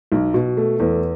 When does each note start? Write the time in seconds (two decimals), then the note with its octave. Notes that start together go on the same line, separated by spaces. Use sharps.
0.12 B1
0.34 B2
0.57 A3
0.80 E2